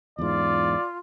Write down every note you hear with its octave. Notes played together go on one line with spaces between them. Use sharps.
E2 G#2 F4 D5